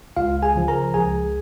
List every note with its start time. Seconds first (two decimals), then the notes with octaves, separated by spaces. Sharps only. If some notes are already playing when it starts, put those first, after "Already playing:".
0.17 C#2 F4 F5
0.43 G#4 G#5
0.55 C#3 F3
0.68 A#4 A#5
0.94 C#2 G#4 G#5